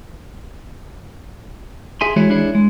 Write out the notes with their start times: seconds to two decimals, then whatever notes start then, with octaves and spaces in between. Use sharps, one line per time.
2.01 G#4 E5 G#5 C6
2.16 E3 G#3 E4 F#4 G#4 C#5
2.30 D4 E4 G#4 C#5
2.55 G#3